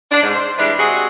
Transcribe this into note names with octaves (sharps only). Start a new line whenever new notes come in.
D4
G#2
C5
E3 G3 G#3 D4 B4
C3 G#3 C4 F#4 G#4